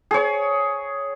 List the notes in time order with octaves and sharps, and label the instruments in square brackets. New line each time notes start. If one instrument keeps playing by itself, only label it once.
[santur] G#4 C#5